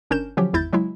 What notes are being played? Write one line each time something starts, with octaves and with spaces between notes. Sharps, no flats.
G1 C#4 D4 A#4 G6 E7
D3 F3 F#3 C#4 G4
G#1 E2 E4 G6 A6
C#3 F#3 G#3 E4